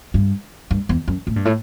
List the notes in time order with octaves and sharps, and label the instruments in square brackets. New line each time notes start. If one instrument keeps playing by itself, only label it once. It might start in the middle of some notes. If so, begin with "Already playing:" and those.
[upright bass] G2
G2
E2
F#2
A2
G2
A2